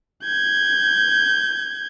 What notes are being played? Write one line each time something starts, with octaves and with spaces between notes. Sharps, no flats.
G6 G#6